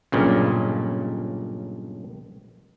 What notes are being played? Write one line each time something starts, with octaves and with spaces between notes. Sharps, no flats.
B1 G2 A#2 C#3